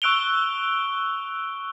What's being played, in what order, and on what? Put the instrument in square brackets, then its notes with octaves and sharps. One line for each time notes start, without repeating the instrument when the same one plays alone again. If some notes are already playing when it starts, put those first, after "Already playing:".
[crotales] C#6 E6 F#6 D7 F7 G7